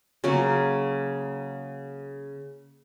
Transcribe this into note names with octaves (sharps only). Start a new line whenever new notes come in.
C#3 F#3 A#3